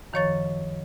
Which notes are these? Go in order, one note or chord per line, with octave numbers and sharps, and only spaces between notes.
F#2 D#3 F3 C#5 C#6 A6